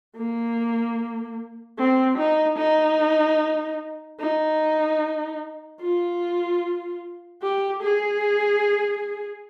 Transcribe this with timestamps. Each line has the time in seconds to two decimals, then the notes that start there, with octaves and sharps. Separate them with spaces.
0.17 A#3
1.78 C4
2.18 D#4
2.59 D#4
4.20 D#4
5.81 F4
7.42 G4
7.83 G#4